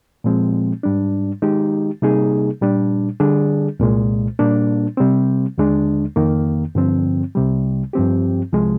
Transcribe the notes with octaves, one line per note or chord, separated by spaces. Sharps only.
A#2 F3 G#3 C4
G#2 G3 D4
D#3 G#3 D#4 G4
C3 G3 A#3 D#4 G#4
A#2 G3 D4
D3 G3 D4 G#4
C2 A#2 G#3
A#2 G3 A#3 D4
C3 G3 C4
D#2 D3 G#3 D4
F2 D#3 A#3
G2 D3 F3 C4
C2 C3 G3
G2 F3 C4 G4
C2 C3 F3 G#3